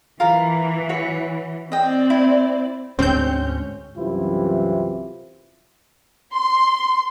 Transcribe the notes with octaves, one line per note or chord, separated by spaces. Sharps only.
E3 F4 A#4
F#4 C#5
C4 D5 D#5 G5
E4
D2 G#2 D3 C4 C#4 G6
C2 F#2 C3 E3 E4 F4
C6